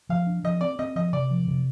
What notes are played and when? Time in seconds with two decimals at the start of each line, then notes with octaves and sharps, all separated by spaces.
0.09 F3 F5
0.27 D4
0.44 F3 D#5
0.61 C4 D5
0.79 C4 D#5
0.96 F3 D#5
1.13 C3 D5
1.31 F3
1.47 C3